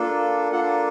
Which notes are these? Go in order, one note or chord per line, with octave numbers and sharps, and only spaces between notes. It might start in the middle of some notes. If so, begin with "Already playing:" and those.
Already playing: A#3 D4 F4 A4
A#3 D4 F4 A4 F#5